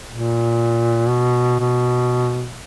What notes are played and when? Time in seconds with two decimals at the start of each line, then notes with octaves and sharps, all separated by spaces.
0.11 A#2
1.10 B2
1.59 B2